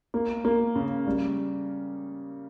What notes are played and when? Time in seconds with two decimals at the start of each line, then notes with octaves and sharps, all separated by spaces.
0.14 A#3
0.45 A#3
0.75 C#3
1.07 G3